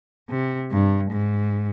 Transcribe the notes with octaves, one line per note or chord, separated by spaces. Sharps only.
C3
G2
G#2